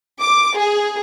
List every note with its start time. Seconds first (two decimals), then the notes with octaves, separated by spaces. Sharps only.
0.20 D6
0.58 G#4